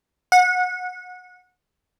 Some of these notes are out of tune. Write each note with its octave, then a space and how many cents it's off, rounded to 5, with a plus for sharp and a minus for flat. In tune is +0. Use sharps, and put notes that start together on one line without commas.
F#5 -25